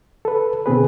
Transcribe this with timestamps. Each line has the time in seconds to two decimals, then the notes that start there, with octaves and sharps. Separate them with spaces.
0.25 A4 B4
0.66 B2 D3 B3 C4 G#4 B4